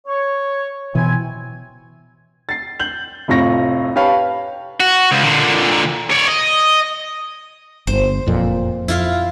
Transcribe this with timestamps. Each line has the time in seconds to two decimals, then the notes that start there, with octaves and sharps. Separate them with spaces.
0.07 C#5
0.95 B2 E3 C4 E4 G#5
2.49 A6 C7
2.80 G6 F#7
3.28 F1 F2 A2 F5 C#6 A#6
3.96 G4 B4 C#5 F5 A5 F7
4.80 F#4
5.12 C#2
5.24 A#2 D3
6.11 C#5 D5
6.28 D#5
7.87 G1 C5
8.26 F#1 F2 A#2
8.88 F2 E4 F4 F5